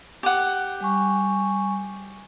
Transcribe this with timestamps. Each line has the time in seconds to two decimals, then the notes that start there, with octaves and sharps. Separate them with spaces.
0.23 G4 F#5
0.81 G3 G#5 C#6